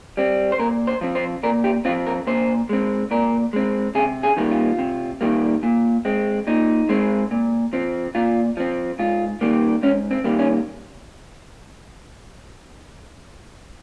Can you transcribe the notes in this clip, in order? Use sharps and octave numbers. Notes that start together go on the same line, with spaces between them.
G3 C4
C5
A#2 A#4
C5
F3 C4
C5
A#2 A#4
G4
F3 C4 F4
A#4
A#2 C5
G#3 C4
A#2 A#4
G#3 C4
C3 G#4
G#4
D#3 G3 A#3
F4
C3
D#3 G3 A#3
A#2
G#3 C4
A#2 D#4
G#3 C4
A#2
F3 C4
A#2 F4
F3 C4
G#2 F4
D#3 G3 A#3
G#2 C#4
C4
D#3 G3 A#3
C#4